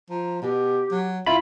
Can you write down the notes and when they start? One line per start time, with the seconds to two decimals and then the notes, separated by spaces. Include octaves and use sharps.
0.10 F3 A#5
0.42 B2 G4
0.91 F#3
1.26 C#2 E4 F4 B5